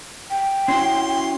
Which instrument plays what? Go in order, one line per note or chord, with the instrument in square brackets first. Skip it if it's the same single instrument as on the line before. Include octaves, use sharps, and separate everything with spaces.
[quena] G5
[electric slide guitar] C#4 E4 F#4 [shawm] C6